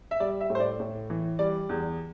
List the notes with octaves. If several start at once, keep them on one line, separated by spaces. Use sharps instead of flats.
E5
G3 D5
E5
A2
C5
D5
A2
E3
G3 D5
E2